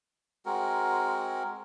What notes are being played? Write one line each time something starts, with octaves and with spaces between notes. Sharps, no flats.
G#3 C4 F#4 A#4